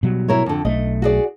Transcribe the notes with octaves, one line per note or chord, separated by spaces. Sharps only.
B2 F#3 G3
E4 A#4 C#5
F2 D3
B1 A3 D#5
F#4 G#4 D5